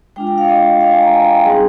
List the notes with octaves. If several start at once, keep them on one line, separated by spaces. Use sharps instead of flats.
G#3 D4 F4 G5
G5
F5
D#5
F5
G#5
A#5
G#5
G5
G3 C4 D#4 G#4